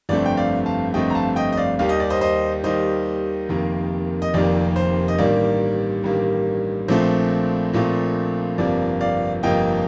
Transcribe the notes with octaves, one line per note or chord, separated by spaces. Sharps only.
G1 F2 D3 A3 C4 D5
G5
D5 F5
F5 A5
G1 F2 D3 A3 C4 D#5 G5
A#5
F5 A5
D#5 G5
D#5
D5 F5
D#2 D#3 G3 F5
D#5
D5
C5 D#5
C5 D#5
D#2 D#3 G3 C5 D#5
F1 F2 C3 D#3 A#3
D#5
F1 F2 C3 D#3 A#3 D5
C5
D#5
A1 G2 D#3 G3 A#3 D5
A1 G2 D#3 G3 A#3
A#1 A#2 F3 A3 C4 C5
A#1 A#2 F3 A3 C4
G1 F2 C3 F3 A#3 D5
D5 F5
G1 F2 C3 F3 A#3 D#5 G5